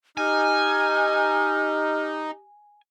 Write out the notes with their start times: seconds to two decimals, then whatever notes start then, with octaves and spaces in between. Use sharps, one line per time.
0.17 D#4 G4 G#5 F6